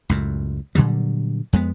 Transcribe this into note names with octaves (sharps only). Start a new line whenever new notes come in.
C#2 F#2 A2
A#2 D3 F#3 G3
F2 G#3 B3